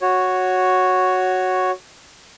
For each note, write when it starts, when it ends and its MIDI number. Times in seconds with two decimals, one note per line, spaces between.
0.02 1.71 66
0.02 1.71 73